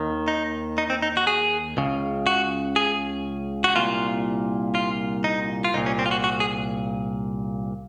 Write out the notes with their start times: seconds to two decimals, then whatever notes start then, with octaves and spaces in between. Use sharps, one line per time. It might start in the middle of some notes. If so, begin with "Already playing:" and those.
Already playing: D#2 D#3
0.28 D#4
0.78 D#4
0.90 C4
1.02 D#4
1.17 F#4
1.27 G#4
1.77 C#2 C#3
2.27 F#4
2.76 G#4
3.64 F#4
3.76 C2 A#2 F4
4.75 F4
5.24 D#4
5.64 F4
5.74 C2 A#2 D#4
5.86 C#4
5.99 C4
6.06 F4
6.11 F#4
6.24 F#4
6.40 G#4